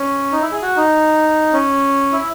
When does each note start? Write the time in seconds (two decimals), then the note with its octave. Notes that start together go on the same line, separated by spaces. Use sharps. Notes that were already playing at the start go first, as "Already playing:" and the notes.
Already playing: C#4
0.32 D#4
0.42 E4
0.51 G#4
0.62 F#4
0.77 D#4
1.53 C#4
2.13 E4